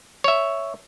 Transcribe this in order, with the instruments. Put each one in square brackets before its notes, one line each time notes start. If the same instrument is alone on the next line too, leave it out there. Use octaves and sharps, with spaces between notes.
[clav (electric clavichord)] C#5 E5